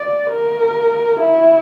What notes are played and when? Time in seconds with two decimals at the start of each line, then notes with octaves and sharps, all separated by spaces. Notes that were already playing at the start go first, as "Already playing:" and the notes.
Already playing: D5
0.31 A#4
1.20 E4